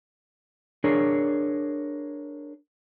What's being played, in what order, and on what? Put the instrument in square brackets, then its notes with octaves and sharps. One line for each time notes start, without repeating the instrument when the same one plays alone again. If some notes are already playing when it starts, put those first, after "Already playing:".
[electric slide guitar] D4 G#4 A#4 C#5